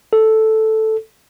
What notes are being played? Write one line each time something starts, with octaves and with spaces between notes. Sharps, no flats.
A4